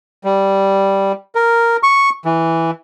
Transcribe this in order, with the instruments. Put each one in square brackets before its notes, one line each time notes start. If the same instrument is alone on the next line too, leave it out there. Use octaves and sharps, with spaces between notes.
[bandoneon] G3
A#4
C#6
E3